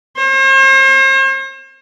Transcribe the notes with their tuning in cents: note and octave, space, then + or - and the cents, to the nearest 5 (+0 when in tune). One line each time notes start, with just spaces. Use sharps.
C5 +45